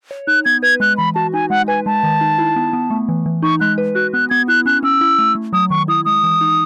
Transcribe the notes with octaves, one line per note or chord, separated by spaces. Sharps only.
C#5
D#4 F#6
B3 G#6
B4 G#6
G#3 F#6
E3 B5
F#4 A5
D#4 G#5
G#3 F#5
B4 G#5
G#3 A5
D#3
D#4
E4
B3
B3
A3
E3
E3
D#4 C#6
G#3 F#6
B4
F#4 F#6
B3 F#6
B3 G#6
E4 F#6
C#4 F#6
C#4 E6
E4
A3
A3
F#3 D#6
D#3 C#6
E4 D#6
G#3 D#6
E3
D#4